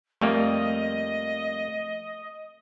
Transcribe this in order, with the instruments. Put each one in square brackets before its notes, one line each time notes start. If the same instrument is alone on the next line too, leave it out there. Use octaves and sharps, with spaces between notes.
[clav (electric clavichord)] F2 G3 A#3 [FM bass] A3 [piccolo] D#5